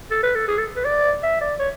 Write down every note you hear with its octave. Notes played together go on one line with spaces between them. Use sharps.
A4
B4
A4
G#4
A4
B4
D5
E5
D5
C#5